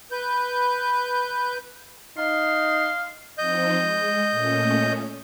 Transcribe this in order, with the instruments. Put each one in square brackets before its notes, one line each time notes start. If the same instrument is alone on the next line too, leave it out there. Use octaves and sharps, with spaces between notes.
[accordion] B4 G6
[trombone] D#4 [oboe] F5 [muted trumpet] C6
[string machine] F3 C4 D#4 [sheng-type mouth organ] D#5 G6
[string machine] G#3
A#2 A3 C#4